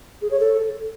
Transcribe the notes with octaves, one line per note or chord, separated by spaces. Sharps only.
G#4
C#5
A4